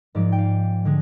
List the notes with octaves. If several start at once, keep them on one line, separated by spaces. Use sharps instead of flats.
G#2 F3 G#3 D5
G5
F5
D3 G#3